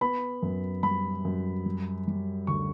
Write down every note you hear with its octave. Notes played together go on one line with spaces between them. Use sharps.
B3 B5
F#2
G3 B5
F#2
G3
G3
D2 C#6